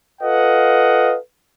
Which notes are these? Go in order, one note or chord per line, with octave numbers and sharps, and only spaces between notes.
F4 A4 B4 D#5 F5 F#5